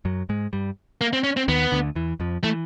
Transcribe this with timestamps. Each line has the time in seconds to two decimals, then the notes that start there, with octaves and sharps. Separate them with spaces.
0.05 F#2 F#3
0.29 G#2 G#3
0.53 G2 G3
1.01 A#3
1.13 C4
1.24 C#4
1.37 C4
1.48 D#2 D#3 B3
1.72 D2 D3
1.95 E2 E3
2.20 F2 F3
2.44 E3 A3